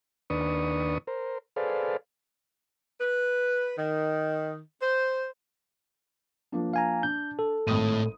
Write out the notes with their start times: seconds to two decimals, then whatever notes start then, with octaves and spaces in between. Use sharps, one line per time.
0.30 D#2 D4 B4 C#6 D#6
1.07 A#4 C5
1.56 G#4 A4 B4 C5 D5 F5
3.01 B4
3.78 D#3
4.82 C5
6.52 F3 A#3 D4
6.74 F5 G#5 A#5
7.03 D4 G6
7.39 A4
7.67 G#1 A2 D#6 D#7